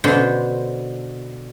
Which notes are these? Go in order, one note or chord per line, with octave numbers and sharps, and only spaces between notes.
B2 D3 C5